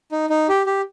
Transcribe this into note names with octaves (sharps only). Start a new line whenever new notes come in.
D#4
D#4
G4
G4